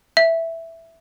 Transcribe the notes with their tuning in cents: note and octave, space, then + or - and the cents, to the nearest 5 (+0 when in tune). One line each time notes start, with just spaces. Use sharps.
E5 +0